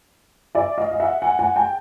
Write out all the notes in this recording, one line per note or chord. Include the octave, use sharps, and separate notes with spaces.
D5 E5
D#5 F5
F5
E5 F#5
F#5 G#5
F#5 G#5
G5 A5